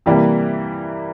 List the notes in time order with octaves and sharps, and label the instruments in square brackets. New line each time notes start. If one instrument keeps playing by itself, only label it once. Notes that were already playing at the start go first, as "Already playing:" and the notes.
[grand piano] C3 E3 G3 A#3